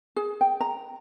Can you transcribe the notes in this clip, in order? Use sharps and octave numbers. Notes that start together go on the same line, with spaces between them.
G#4
G5
A#5